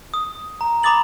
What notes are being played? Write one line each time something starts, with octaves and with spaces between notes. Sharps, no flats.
D#6
A#5
A#5 B5 D6 D#6 A6 F#7